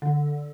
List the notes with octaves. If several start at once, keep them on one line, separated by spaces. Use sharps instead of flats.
D3